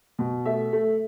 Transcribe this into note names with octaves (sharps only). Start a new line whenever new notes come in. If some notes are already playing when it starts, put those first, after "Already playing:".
B2
A3 E5
A3